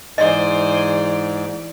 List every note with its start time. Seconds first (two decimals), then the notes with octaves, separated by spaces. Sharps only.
0.18 G#2 E3 G#4 C5 D5 D#5